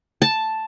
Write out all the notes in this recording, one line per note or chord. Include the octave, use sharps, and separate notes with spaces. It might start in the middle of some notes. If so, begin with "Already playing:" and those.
A5